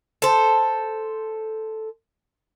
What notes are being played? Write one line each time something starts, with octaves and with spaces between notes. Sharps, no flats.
A4 C5